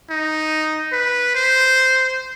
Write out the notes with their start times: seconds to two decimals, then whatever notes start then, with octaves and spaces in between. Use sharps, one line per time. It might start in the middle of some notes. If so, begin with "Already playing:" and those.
0.10 D#4
0.92 B4
1.35 C5